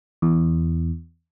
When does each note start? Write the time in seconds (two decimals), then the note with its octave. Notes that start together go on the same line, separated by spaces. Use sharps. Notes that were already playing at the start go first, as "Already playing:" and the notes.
0.22 E2